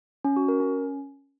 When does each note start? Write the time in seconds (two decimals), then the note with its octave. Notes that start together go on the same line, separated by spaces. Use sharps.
0.25 C#4
0.36 F#4
0.48 A#4
0.60 C#4